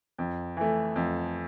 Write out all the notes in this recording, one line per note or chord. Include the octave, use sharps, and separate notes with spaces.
F2
E3 A3
F2